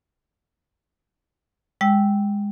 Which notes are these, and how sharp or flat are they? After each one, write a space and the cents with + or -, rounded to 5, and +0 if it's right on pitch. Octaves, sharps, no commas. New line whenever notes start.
G#3 -25 G5 -10 E6 -5